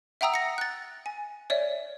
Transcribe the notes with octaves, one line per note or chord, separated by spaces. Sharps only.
E5 F#5 G5 A#5 D#6 E6
A#6 C#7
F#6 A6
G#5
C#5 D5 E5